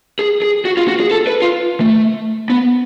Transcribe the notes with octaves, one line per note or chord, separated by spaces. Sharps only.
G#4
G#4
F#4
F4
F#4
G#4
A4
B4
F4
A3
B3